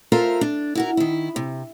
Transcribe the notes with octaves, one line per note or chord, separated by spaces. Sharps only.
F4 A4 A#4 C5 E5
D4
E4 F#4 A#4
D#3 E4
C3